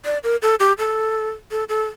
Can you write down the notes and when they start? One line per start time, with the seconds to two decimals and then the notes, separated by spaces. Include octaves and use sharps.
0.05 D5
0.23 A#4
0.42 A4
0.60 G4
0.79 A4
1.51 A4
1.69 A4